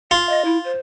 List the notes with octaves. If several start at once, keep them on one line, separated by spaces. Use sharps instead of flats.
F4 F5
D#5
E4
C5